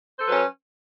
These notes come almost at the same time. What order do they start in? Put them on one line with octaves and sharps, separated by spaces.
C5 A4 B4 F#3 C#4